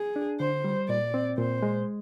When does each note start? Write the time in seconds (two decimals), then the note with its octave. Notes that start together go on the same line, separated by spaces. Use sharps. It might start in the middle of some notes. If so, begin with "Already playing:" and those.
Already playing: G#4
0.16 D4
0.40 D3 C5
0.64 G3
0.89 A#2 D5
1.14 C4
1.38 A#2 C5
1.63 G#3